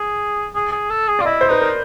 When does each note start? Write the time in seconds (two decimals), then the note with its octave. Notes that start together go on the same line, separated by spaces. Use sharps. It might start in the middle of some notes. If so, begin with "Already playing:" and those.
Already playing: G#4
0.55 G#4
0.72 G#4
0.90 A4
1.08 G#4
1.19 F4 D5
1.25 E4 D#5
1.41 C5
1.49 D#4 B4
1.61 A#4